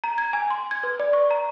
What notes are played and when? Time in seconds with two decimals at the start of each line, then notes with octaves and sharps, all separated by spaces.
0.04 A#5
0.18 G#6
0.33 G#5
0.50 C6
0.71 G#6
0.83 B4
1.00 D5
1.13 C#6
1.31 A#5